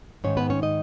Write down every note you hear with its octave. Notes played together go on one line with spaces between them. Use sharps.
G#2 D#3 C#4 C#5
B3 B4
C#4 C#5
D#4 D#5